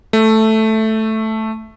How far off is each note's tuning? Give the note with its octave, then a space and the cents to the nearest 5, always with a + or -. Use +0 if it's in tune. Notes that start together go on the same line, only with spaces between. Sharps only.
A3 +0